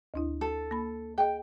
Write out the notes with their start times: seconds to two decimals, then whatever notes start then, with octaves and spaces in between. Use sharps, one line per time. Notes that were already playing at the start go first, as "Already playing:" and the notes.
0.14 D2 D4 E4
0.41 A4
0.71 A#3 B5
1.18 G#4 D#5 G5